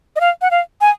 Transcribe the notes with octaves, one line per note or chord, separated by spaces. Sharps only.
D#5
F5
F#5
F5
G#5